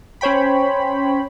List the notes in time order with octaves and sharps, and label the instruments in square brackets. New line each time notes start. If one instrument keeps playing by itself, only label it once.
[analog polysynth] C#4 C5 C#5 G5 B5